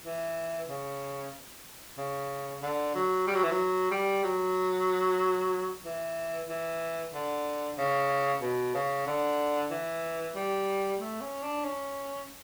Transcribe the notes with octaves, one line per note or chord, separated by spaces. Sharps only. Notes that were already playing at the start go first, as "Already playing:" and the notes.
E3
C#3
C#3
D3
F#3
G3
F#3
E3
F#3
G3
F#3
E3
E3
D3
C#3
B2
C#3
D3
E3
G3
A3
C#4
D4
C#4